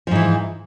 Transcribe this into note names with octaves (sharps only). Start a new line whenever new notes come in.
G#2 E3 F3